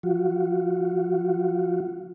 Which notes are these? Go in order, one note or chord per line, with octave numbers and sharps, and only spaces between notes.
F3 F4 F#4